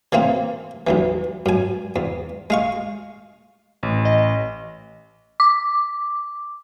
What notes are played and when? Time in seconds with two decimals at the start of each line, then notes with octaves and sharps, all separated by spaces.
0.12 C#3 E3 A#3 C4
0.87 B1 E2 E3
1.46 F#2 G#5
1.96 E2
2.50 G#3 F5 C#6
3.83 A1
4.05 D#5
5.40 D6